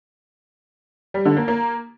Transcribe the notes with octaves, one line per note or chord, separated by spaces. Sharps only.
G3
D3
A#3
A#3